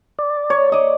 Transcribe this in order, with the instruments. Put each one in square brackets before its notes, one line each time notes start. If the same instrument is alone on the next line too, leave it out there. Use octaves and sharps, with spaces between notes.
[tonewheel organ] D5
[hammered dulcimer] C#5
D5 D#5